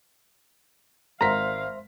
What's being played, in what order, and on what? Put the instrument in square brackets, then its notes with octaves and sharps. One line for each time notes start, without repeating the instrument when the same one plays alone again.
[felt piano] G#1 A#4 B6 [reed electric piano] C5 E5 C6 [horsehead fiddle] F5 [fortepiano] A#5